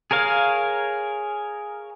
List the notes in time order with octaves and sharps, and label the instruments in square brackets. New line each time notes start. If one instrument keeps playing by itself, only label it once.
[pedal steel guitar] G#4 A#4 C#5 F5